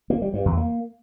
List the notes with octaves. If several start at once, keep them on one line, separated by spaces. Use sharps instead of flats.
A#3
G3
G2
E2
A#3